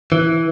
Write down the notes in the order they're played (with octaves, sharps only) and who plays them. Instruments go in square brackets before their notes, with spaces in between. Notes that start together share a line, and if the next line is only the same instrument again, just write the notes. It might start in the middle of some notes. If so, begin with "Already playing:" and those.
[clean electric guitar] E3